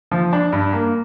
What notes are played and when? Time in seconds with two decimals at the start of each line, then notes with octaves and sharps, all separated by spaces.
0.11 F3
0.33 D4
0.52 G2
0.73 A#3